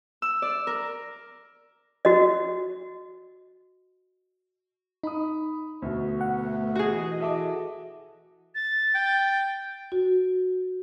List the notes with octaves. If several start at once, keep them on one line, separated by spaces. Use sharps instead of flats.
E6
D5
A#4
F#4 D#5
D#4 B5 D#6
D2 B2
A3 B3 F#5
E3 F#4 G#4 D#5
A4 E5 D6
A6
G5
F#4